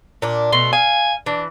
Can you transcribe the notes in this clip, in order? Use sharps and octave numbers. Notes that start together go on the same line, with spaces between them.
A#2 D4
B2 A3 C6
F5 G#5
E3 D4